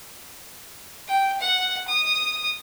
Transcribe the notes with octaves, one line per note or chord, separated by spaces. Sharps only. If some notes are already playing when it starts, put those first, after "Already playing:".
G5
F#5
D#6